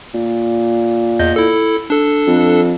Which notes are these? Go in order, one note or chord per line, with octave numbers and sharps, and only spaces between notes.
A#2
E2 D#5 G6
E4 A4
D4 A4
F2